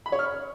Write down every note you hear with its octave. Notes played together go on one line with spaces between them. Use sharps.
B5
C#5
F6